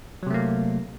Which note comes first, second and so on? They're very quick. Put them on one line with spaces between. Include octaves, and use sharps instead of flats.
F#3 C3 A3 A#3